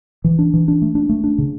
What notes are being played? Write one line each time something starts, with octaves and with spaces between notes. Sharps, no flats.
E3
D4
E3
D4
A3
D4
A3
D4
C#3